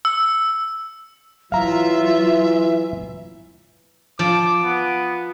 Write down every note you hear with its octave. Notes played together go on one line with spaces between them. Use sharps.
E6
E3 F#3 F4 E5 F5 A#5
F3 D6
B3